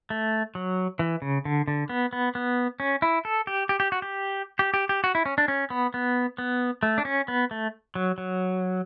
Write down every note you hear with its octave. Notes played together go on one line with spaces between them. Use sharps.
A3
F#3
E3
C#3
D3
D3
B3
B3
B3
C#4
E4
A4
G4
G4
G4
F#4
G4
G4
G4
G4
F#4
E4
C#4
D4
C#4
B3
B3
B3
A3
D4
C#4
B3
A3
F#3
F#3